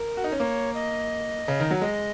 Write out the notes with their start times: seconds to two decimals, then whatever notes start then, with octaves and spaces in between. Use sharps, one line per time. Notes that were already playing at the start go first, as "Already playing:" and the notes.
Already playing: A#4
0.17 F#4
0.24 D#4
0.32 C#4
0.39 A#3 C#5
0.74 D#5
1.48 C#3
1.60 D#3
1.70 F#3
1.81 G#3 D#5